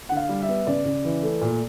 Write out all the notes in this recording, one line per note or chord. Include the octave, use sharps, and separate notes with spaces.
D3 F#5
F5
G3
E5
B3
C#3 D5
C#3
E3
A3
A#2